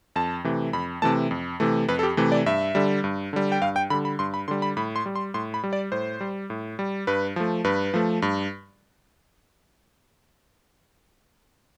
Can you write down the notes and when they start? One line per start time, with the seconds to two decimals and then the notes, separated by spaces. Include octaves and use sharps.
0.16 F2 A5
0.44 C3 E3 A3
0.73 F2 B5
1.02 C3 E3 A3 A5
1.31 F2
1.60 C3 E3 A3
1.89 F2 B4
1.99 A4
2.03 G4
2.17 C3 E3 A3
2.32 D5
2.46 G2 E5
2.75 D3 G3
3.04 G2
3.33 D3 G3
3.52 G5
3.62 G2 F5
3.76 G5
3.90 D3 B5
3.94 G3
4.05 B5
4.19 G2 C6
4.34 B5
4.48 D3 G3 C6
4.62 B5
4.77 A2 B5
4.96 C6
5.06 G3
5.16 C6
5.34 A2 C6
5.54 B5
5.64 G3
5.73 D5
5.92 A2 C5
6.21 G3
6.50 A2
6.79 G3
7.07 G2 B4
7.36 F3 A3
7.64 G2 B4
7.94 F3 A3
8.22 G2